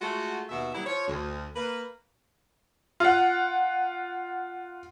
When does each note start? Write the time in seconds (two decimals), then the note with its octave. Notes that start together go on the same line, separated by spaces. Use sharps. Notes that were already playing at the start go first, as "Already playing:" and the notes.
0.01 G#3 A3 F4 F#4
0.49 D#2 B2 E5
0.73 F#3 G3 A#3 D#4 E4
0.86 F3 C#5
1.08 D2
1.56 A#3 B4
3.00 F4 F#5